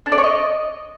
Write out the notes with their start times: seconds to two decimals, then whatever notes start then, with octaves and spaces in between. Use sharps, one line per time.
0.06 D4
0.12 D5
0.18 C#5
0.24 D#5